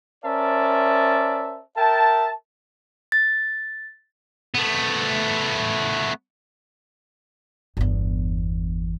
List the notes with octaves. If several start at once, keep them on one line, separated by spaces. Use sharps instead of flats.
C#4 A#4 C5 D5 E5 A5
A#4 E5 G5 A5
A6
A3 B3
G1 E2